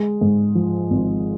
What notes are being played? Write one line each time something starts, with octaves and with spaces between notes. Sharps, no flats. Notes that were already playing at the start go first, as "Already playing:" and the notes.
Already playing: G#3
G#2
F3
G#1